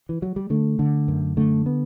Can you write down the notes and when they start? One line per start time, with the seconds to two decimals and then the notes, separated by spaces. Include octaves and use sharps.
0.09 E3
0.22 F#3
0.36 G3
0.50 D3 A3
0.79 D3
1.08 F#2
1.37 D3 A3
1.66 B3